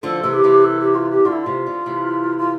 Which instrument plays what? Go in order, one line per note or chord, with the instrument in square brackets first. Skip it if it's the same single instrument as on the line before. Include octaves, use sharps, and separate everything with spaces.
[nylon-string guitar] D3 F3 [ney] A4
[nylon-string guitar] C3 E3
[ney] G4
[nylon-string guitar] C3 E3
[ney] A4
G4
F4
G4
[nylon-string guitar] D3 [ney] F4
[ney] E4
F4
[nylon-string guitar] C3
D3
C3 E3
[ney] F4